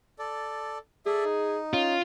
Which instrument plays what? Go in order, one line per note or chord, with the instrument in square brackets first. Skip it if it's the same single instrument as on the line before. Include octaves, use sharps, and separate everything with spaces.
[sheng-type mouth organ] A4 D5
[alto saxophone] G#4 [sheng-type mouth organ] A4 D5 E5
[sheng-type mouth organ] D#4
[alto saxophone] C#4 [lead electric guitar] F4